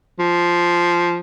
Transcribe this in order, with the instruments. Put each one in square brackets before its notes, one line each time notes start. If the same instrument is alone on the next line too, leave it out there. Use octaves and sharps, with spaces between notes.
[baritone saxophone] F3